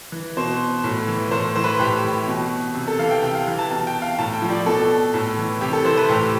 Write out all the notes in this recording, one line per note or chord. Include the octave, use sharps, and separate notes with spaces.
E3
B2 C5
A2
E3
A2 C5
E3 C5
B4
A2 G4
E3
B2
C3
A4
E3 F5
G5
C3 G5
F5
E3
A5
B2 A5
G5
F5
A2 A5
G5
F3
D5
B2 A4
A2
E3
C3 G4
A4
E3 C5
B4
A2 G4